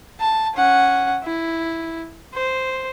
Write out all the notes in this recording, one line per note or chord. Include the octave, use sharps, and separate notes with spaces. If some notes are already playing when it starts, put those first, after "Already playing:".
A5
C#4 F#5
E4
C5